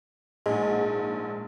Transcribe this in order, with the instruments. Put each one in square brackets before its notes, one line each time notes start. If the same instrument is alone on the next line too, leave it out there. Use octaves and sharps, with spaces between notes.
[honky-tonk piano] A#1 G#2 [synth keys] G#3